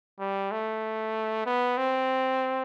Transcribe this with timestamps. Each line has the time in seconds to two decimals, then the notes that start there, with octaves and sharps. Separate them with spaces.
0.20 G3
0.51 A3
1.46 B3
1.78 C4